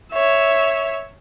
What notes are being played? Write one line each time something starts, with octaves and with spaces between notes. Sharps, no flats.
C#5 E5